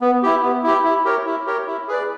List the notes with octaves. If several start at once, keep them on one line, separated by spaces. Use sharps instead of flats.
B3
E4 G4
B3
E4 G4
E4
G4 A#4 C#5
E4
G4 A#4 C#5
E4
G#4 B4 D5